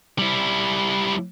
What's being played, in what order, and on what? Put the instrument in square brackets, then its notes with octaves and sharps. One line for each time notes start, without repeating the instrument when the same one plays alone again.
[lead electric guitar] G3 E4